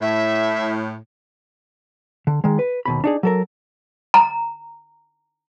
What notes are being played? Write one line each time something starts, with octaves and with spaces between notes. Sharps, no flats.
A2 E5
D3
D#3 G#3
B4
D#2 B2 B5
D4 D#4 G#4
F#3 A4 A#4
A#5